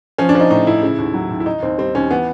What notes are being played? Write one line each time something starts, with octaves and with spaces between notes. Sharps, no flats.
F3 C#4
D4
F3 D#4
A2 D#4
A2 E4
C#3
D#2
F#3
D#2
E4
D#3 D#4
D#2 C4
G3 C4
D#2 C#4
E3 B3